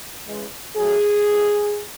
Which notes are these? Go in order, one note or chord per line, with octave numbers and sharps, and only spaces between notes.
C#3 E3 G#3
A2 F#3 A3 G#4
A2 E3 G#3